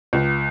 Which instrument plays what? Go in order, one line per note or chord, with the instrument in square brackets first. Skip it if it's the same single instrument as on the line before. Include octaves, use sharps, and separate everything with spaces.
[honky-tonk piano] C#2